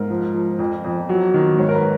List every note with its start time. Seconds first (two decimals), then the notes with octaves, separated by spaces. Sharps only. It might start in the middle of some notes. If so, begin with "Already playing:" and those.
Already playing: G#2 A#4
0.10 F3
0.34 F3
0.59 F2
0.84 F2
1.09 F#3
1.34 D#3
1.58 G#2 C#5
1.69 A#4
1.75 B4